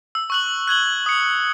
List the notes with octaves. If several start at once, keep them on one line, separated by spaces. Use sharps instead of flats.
E6
C#6 F#6 F#7
F#6 G#6 F#7 G7
D#6 C#7